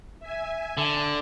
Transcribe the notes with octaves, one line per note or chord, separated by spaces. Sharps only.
E5 G#5
D3